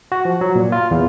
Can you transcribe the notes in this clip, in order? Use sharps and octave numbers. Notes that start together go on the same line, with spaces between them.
F#4
F3
F#3
A#2
F4
E2